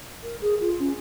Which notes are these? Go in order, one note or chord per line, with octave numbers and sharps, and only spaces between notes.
A#4
G#4
F4
C#4